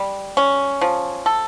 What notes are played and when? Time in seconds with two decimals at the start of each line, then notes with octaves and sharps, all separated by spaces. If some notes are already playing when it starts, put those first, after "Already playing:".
Already playing: G3
0.37 C#4
0.81 F3
1.26 A4